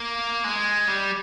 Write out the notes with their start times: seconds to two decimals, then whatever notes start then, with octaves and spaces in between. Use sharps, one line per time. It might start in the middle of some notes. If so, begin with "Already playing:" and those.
Already playing: A#3
0.44 G#3
0.88 G3